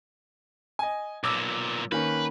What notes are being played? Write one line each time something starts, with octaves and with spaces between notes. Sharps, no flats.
D#5 G#5
B1 A#2 D6 E6
D#3 A#3 C#4 B4